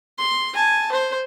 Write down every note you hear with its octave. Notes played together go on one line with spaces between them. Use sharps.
C6
G#5 A5
C5